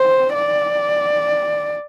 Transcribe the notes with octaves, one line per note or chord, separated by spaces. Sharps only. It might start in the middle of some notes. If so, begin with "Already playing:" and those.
Already playing: C5
D5